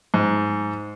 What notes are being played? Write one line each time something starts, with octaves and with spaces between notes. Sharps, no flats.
G#2